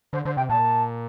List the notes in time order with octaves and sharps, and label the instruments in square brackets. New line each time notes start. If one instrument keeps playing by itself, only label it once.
[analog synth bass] D3 [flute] C5
[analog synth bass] D3 [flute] C5
[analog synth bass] C3 [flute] G5
[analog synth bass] A#2 [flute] A5